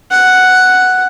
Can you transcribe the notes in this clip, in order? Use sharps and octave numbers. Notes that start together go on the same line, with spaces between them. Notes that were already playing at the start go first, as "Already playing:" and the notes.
F#5